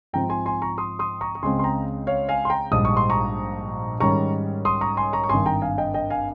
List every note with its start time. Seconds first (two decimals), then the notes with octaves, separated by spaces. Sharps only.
0.13 G#2 F3 C4 G5 A#5
0.30 G#5 C6
0.46 G#5 C6
0.62 A#5 C#6
0.78 C6 D#6
0.99 C6 D#6
1.21 A#5 C#6
1.35 C#6
1.43 C#2 C#3 G#3 C4 G#5 C6
1.59 C6
1.64 G5 A#5
2.07 C#5 F5
2.29 F5 G#5
2.45 C6
2.50 G5 A#5
2.71 A#1 G#2 G3 D#6
2.85 C#6
2.97 C6
3.10 A#5 C#6
4.00 G#2 D#3 G3 C#4 A#5 C#6
4.65 C6 D#6
4.81 A#5 C#6
4.97 G#5 C6
5.13 A#5 C#6
5.24 C#6
5.29 G#1 G2 D#3 G#5 C6
5.46 G5 A#5
5.62 F5 G#5
5.78 D#5 G5
5.94 D#5 G5
6.10 F5 G#5